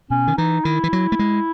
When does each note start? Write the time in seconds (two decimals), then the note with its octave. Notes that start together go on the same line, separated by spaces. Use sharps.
0.10 B2 C#4
0.27 D#3
0.37 E3 D#4
0.65 D#3 E4
0.84 E3
0.93 F#3
1.12 A3
1.19 G#3